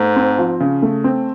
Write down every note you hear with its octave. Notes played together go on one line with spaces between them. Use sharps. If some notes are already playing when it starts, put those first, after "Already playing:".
Already playing: G#2 A3
C4
F3
C#3
A3
C4